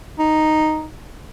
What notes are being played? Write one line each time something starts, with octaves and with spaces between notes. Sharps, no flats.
D#4